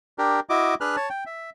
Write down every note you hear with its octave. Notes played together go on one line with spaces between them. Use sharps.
D4 G4 A#4
E4 F#4 D#5 D6
D4 G#4 B4 F6 F#6
C#5 A5
G5
E5